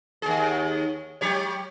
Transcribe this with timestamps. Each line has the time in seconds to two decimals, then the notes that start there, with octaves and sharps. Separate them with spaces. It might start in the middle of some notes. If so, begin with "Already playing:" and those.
0.22 D#2 G#4
1.21 F#3 G4 C#5